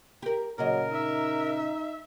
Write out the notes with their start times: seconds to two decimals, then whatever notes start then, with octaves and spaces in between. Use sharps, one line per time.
0.22 G4 A#4
0.58 A#2 C#3 F#3 A#4 D#5
0.92 D#4 E5